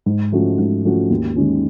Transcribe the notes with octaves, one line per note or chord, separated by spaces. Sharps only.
G#2
F3 A3 C#4 F#4
G#2
F3 A3 C#4 F#4
D#2
D#3 G#3 C#4